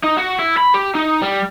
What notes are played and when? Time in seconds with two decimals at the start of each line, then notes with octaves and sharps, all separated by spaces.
0.03 D#4
0.17 F#4
0.39 E4
0.57 B5
0.74 G4
0.95 D#4
1.22 G3